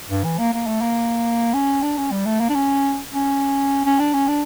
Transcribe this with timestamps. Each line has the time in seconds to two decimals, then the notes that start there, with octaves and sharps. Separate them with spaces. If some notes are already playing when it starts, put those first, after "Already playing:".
0.10 G2
0.24 E3
0.39 A#3
0.53 A#3
0.67 A3
0.81 A#3
1.54 C#4
1.83 D4
1.97 C#4
2.11 G3
2.26 A3
2.41 A#3
2.49 D4
2.54 C#4
3.13 C#4
3.85 C#4
3.99 D4
4.13 C#4
4.28 D4